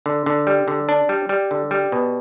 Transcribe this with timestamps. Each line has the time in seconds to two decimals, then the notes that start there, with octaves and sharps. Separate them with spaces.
0.06 D3
0.26 D3
0.47 G3
0.68 D3
0.89 D4
1.09 G3
1.29 G3
1.51 D3
1.71 G3
1.92 B2